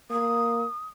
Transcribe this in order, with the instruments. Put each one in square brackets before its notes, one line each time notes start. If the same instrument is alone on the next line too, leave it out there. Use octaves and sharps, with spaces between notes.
[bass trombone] A#3 [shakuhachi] D#6